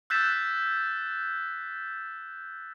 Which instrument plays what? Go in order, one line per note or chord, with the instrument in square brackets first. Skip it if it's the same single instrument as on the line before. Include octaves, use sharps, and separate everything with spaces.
[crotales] E6 F#6 G6 A6 B6 E7